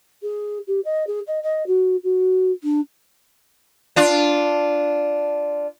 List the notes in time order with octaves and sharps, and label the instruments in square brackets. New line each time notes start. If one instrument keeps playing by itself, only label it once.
[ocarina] G#4
G4
D#5
G#4
D#5
D#5
F#4
F#4
D4
[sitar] D4 F4